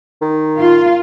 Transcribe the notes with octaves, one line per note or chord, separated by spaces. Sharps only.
D#3
F4